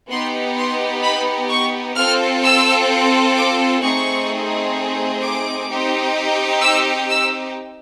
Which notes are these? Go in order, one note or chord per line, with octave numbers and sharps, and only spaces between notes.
B3 D#4 G4 C6
C6
B5
C#6
C4 F4 A4 F6
E6
D6
A3 C4 D#4 G#4 C#6
D6
C4 D#4 G4
E6
E6